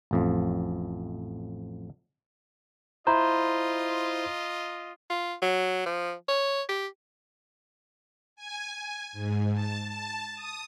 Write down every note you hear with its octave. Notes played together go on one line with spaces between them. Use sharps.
A1 F2 F3
E4 F4 C5 D#5 A#5
F4
F#3
F3
C#5
G4
G#5
G#5
G#2
A5
A5
D#6